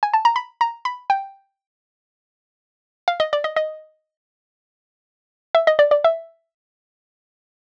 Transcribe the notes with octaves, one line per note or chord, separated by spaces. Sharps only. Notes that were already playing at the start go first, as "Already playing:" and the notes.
G#5
A5
A#5
B5
A#5
B5
G5
F5
D#5
D5
D#5
D#5
E5
D#5
D5
D5
E5